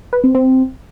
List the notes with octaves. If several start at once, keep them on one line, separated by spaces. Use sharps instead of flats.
B4
C4
C4